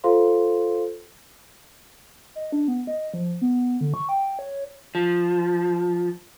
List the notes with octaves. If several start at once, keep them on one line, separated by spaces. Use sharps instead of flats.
F4 A4 C5 F5 C6
D#5
D4
B3
D#5
F3
B3
D3
C#6
G5
C#5
F3